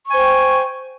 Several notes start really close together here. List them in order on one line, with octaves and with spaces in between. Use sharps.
C#6 G#5 C5 G5